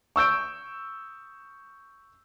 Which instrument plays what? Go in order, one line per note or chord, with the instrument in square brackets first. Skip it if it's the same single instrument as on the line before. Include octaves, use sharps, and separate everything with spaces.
[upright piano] C#6 E6 G6 D7